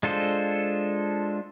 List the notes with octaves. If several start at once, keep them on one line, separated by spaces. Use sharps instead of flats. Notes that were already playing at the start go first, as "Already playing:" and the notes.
G#3 D4 F4 A4 C5